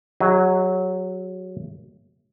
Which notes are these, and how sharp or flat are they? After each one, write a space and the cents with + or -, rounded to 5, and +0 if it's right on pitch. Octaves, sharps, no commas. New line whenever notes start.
F#3 +0 G#4 -30 D#5 +0